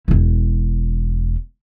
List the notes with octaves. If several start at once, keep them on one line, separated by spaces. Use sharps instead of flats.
E1 E4